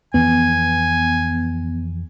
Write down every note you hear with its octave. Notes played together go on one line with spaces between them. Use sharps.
F2 E3 F3 B3 G#5